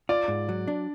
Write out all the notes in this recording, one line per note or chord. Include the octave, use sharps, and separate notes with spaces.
F4 D5
G#2
F#3
D4